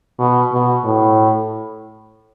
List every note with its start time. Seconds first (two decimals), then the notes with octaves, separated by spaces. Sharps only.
0.19 B2
0.52 B2
0.84 A2